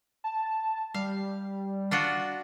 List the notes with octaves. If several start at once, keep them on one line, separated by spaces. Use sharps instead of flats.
A5
G3 F5
D4 F4 F#4